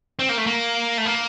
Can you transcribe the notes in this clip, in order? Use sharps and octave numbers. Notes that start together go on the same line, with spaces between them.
C4
A#3
A3
A#3
A3
A#3